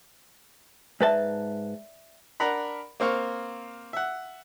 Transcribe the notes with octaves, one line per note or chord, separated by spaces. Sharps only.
G#2 B4 D5 E5 A5
D4 A#4 F#5 A#5 B5
A#3 C4 F5 C#6
E5 F#5